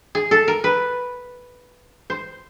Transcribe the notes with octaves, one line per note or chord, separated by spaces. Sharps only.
G#4
A4
A#4
B4
C5